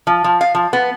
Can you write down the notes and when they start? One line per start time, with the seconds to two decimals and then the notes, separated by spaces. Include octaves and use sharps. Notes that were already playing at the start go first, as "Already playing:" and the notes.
0.07 F3
0.24 F3
0.41 F5
0.55 F3
0.73 B3